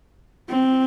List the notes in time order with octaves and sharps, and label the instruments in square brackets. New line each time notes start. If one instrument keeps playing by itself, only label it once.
[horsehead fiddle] C4